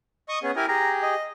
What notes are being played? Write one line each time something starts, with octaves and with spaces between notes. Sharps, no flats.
D#5 C#6 D#6
B3 C#4 G#4
E4 G4 A#4 G#5
G4 G#4 A#5
D#5